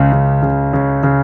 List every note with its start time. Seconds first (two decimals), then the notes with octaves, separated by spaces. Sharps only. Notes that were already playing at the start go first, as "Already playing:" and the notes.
Already playing: C#2 C#3
0.13 C#3
0.43 C#3
0.73 C#3
1.03 C#3